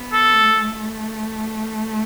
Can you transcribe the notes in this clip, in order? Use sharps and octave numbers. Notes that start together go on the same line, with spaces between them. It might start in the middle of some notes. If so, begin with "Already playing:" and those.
Already playing: B3
A4
A3